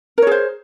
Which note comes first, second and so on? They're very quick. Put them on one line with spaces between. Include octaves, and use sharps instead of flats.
A#4 C#5 G#4 C5